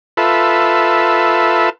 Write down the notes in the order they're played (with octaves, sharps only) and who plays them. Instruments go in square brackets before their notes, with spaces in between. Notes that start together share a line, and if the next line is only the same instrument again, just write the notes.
[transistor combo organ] F4 A4 B4 E5